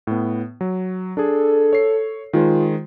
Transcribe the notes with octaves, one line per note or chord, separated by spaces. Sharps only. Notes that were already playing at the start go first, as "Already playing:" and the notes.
A2 B3
F#3
D4 G#4 A4
C#5 C7
D#3 G#3 F4 C5